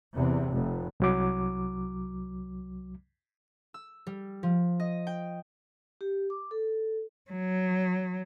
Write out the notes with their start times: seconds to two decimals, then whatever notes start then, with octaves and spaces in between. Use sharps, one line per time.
0.14 E2 C3
0.51 F1
1.00 C2 F#3 D6
3.74 E6
4.07 G3
4.43 F3
4.80 D#5
5.07 G5
6.01 G4
6.30 D6
6.51 A4
7.31 F#3